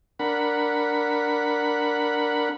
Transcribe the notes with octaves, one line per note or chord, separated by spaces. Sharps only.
D4 A#4 F#5 B5